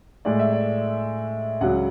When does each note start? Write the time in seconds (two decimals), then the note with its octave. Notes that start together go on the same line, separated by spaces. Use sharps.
0.25 A2 G#3 D5
0.39 E5
0.53 D5
1.61 C#2 C#3 F#3 F#5